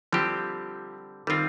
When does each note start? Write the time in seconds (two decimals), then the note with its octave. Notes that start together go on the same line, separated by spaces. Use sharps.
0.12 D3 F3 G3 C4 G4
1.27 D#3 G3 C4 F4